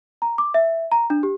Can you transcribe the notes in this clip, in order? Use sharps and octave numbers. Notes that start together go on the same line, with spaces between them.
A#5
D6
E5
A#5
D4
G4